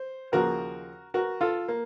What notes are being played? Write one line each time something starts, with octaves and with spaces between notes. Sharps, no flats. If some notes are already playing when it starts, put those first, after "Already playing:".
Already playing: C5
D#2 C#3 F3 F#4 A#4
F#4 A#4
F4 A4
A#3